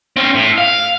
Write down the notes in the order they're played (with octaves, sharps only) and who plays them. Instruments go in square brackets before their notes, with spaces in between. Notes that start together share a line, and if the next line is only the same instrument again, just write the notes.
[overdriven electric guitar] C4 C#4
A2
F5